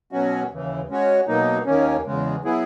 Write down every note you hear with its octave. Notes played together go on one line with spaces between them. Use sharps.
B2 F#3 C#4 F#4
D#2 C#3 E3
G#3 C#4 F#4 C#5
B2 F#3 A#3 D#4
D#2 D#3 A#3 C#4
E2 C#3 G#3
F#3 B3 E4 G#4